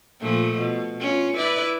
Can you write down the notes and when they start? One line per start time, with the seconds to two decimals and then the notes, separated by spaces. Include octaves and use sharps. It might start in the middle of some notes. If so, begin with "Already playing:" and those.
0.21 A#2 F3 A3
0.59 B2
1.00 C#4 F4
1.37 E4 B4 D5